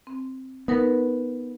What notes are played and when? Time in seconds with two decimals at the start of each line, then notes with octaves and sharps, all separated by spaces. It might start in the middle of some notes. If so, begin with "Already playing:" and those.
0.07 C4
0.68 B3 D#4 A#4 B4